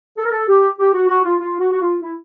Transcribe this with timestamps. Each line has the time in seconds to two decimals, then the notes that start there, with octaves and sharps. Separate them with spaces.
0.18 A4
0.25 A#4
0.32 A4
0.49 G4
0.79 G4
0.94 F#4
1.09 F#4
1.25 F4
1.40 F4
1.60 F#4
1.72 F#4
1.81 F4
2.02 E4